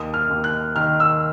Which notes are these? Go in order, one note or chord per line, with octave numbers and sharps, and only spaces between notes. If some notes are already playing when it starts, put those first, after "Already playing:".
Already playing: D#2 D#6
F6
D#2
F#6
D#3 F6
E6